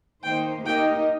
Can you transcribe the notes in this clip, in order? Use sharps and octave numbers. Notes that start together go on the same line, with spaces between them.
D#3 A#3 D#4 C5 G5
A#3 D#4 G4 A#4 D#5 G5